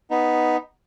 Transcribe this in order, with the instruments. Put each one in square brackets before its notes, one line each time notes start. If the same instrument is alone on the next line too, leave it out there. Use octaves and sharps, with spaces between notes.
[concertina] B3 D#4